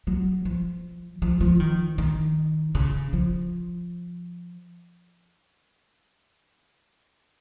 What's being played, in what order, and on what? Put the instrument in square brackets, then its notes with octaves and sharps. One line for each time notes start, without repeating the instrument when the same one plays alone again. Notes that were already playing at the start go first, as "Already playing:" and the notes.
[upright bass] F#3
F3
F3
F3
D#3
D#3
C#3
F3